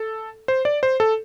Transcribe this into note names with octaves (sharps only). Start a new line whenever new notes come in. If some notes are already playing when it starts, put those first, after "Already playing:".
Already playing: A4
C5
D5
C5
A4